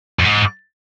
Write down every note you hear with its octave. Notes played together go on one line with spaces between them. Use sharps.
F2
G#2